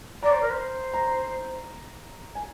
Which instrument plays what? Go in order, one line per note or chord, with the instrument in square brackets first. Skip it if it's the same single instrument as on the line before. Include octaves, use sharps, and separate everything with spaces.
[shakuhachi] D5 [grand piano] A#5
[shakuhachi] C5
A#4
C5
[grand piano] A#5
G#5